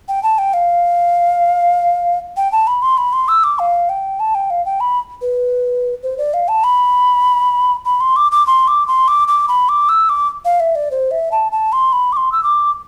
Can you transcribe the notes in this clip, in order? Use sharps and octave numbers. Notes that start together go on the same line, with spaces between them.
G5
A5
G5
F5
G5
A5
B5
C6
B5
C6
E6
D6
F5
G5
A5
G5
F5
G5
B5
B4
C5
D5
F5
A5
B5
B5
C6
D6
D6
C6
D6
C6
D6
D6
B5
D6
E6
D6
F5
E5
D5
C5
E5
A5
A5
C6
B5
D6
C6
E6
D6